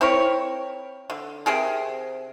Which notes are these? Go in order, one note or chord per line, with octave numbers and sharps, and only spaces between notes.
C4 E4 A#4 C#5
D3
C3 C4 G#4 A#4